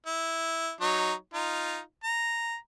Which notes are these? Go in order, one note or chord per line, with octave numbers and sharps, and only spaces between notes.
E4
F#3 D#4 C#5
D#4 F4
A#5